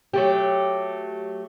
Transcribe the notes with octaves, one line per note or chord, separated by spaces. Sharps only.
F#3 A3 G4